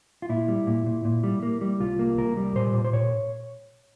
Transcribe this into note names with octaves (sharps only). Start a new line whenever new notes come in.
F4
A#2 E4
G3
A#2
A#2
A#2
G3
A#3
G3
C2 F4
A#3
C2 A#4
G3
A#2 C5
A#2
C5
A#2 C#5